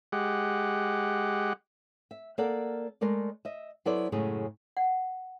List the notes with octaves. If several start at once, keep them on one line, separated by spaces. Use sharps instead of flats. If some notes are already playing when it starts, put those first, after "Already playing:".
G#3 G4 F#5
E5
A#3 A4 A#4 D5 F#5
G#3 A3 A#4 D5
D#5 E5
F#3 B3 E4 A4 C5 D5
F#2 A2 C#3 G#3 G#4
F#5